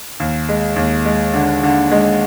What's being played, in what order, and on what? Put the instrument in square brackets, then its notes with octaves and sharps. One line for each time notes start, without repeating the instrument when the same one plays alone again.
[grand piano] D#2
G#3
D#2
G#3
D3
D3
G#3